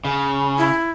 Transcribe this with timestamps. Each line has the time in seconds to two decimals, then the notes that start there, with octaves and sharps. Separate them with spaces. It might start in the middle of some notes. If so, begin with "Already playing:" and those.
0.05 C#3
0.58 E4